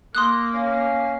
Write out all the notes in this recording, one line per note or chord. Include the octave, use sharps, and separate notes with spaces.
A#3 C6 D#6 F#6
C#4 F5